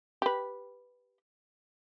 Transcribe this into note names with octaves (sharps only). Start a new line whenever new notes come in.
G4 B4